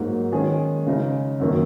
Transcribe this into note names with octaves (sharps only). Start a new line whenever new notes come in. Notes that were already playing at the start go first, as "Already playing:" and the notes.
Already playing: G#2 F#3 A#3
D#3 G#3 C#4 G#4
C#3 G#3 D#4
F#2 D#3 F#3 A#3